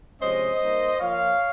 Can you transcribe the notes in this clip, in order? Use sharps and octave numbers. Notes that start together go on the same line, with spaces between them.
C3 F3 G#3 C#4 C5 D#5
G3 A#3 D#4
F3 A#3 F4 C#5 F5